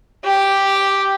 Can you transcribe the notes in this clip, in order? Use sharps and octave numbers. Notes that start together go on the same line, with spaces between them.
G4